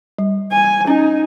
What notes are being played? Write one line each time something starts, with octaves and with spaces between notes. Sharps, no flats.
G3
G#5
C#4 D#4